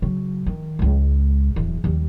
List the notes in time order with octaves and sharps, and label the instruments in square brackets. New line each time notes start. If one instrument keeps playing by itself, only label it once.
[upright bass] C#3 F#3
D#3
C#2 G#3
D1 E2
D#2 G3